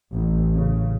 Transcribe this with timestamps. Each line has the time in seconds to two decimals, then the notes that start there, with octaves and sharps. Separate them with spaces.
0.12 A1
0.54 C#3